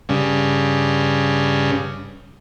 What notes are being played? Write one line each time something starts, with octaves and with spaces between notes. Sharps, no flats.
G2 C#3